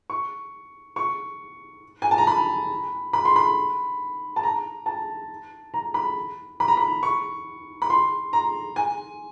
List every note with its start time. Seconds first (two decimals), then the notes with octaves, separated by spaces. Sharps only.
0.10 C#6
0.96 C#6
2.02 G#5
2.11 A5
2.18 A#5
2.27 B5
3.13 B5
3.25 C6
3.36 B5
4.36 A5
4.43 A#5
4.86 A5
5.74 A#5
5.94 B5
6.60 B5
6.68 A#5
6.77 B5
7.03 C#6
7.82 B5
7.90 C6
8.33 A#5
8.76 G#5